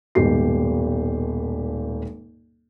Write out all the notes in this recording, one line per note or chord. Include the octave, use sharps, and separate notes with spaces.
D#1 G#1 B2 G4 C7